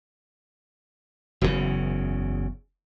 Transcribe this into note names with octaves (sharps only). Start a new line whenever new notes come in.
F#1 E2 G2 C#3